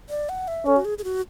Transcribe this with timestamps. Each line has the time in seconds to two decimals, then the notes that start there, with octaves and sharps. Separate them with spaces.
0.09 D5
0.29 F#5
0.48 E5
0.66 C#4 A4
0.76 F#4
0.85 G#4
0.98 G#4
1.04 F#4